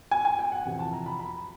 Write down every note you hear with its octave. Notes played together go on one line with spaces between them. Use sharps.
G#5
G#5
G5
F#5
F2 C3 E3
A5
A#5
B5
B5